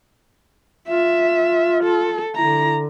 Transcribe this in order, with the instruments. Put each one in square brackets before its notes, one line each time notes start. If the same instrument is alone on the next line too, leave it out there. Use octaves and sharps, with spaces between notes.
[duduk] F4 [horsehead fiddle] E5
[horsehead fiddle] A4
[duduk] D3 [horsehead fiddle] E4 A#5